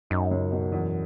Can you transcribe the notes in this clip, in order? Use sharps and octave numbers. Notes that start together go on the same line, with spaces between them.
F#2 D#4
C#2
B2
E2